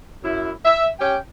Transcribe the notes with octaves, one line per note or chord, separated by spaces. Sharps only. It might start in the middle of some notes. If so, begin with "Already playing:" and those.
F#2 E4
E5
C#4 G4 G5